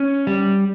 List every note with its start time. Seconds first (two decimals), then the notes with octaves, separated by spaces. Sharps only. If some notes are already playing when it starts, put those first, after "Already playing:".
Already playing: C#4
0.27 G3